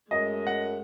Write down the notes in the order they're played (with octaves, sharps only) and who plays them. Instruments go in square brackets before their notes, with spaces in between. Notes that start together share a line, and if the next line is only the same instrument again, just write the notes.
[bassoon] F#2 [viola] G#3 A3 [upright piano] D#5
[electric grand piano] F#5